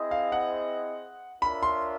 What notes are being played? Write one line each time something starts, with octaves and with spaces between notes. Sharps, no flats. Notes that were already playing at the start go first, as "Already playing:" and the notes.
Already playing: C4 E4 G#4 C5 D#5
F5
F#5
D4 F4 A#4 C#5 E5 B5
C6